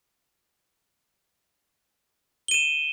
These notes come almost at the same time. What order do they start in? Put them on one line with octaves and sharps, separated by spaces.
G7 D#7 E7